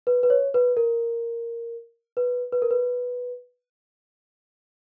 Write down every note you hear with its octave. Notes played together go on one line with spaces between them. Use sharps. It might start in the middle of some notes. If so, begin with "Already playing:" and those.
B4
B4
C#5
B4
A#4
B4
B4
A#4
B4